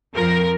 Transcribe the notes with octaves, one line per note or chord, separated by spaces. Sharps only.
F2 F3 A#4